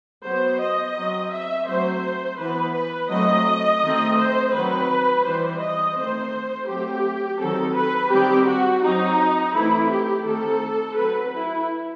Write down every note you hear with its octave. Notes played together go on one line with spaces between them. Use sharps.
F#3 B3 C5
D#5
F#3 C4
E5
F#3 A3 C4 C5
E3 B3 B4
B4
F#3 A3 C4 D#5
D#3 A3 C4
C5
D#3 F#3 C4 B4
E3 G3 C4 C5
D#5
D#3 A3 C4 C5
F#3 A3 C4 G4
D#3 F#3 C4 A4
B4
D#3 G3 C4 G4
F#4
F#3 C4 D#4
E3 A3 C4 E4
G4
D#3 A3 C4 A4
F#3 C4 B4
E4